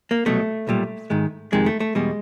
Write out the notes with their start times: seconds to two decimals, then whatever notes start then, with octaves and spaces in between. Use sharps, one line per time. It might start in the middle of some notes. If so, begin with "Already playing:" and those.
0.11 A#3
0.26 C2 B2 F#3 A3
0.67 B1 A#2 G3
1.10 G#2 D#3 G#3
1.52 F2 C3 D#3 G#3
1.66 A3
1.80 A3
1.95 E2 B2 G3 G#3